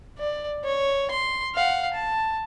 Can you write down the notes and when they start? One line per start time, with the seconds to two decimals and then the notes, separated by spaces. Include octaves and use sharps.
0.18 D5
0.64 C#5
1.11 C6
1.55 F5 F#5
1.94 A5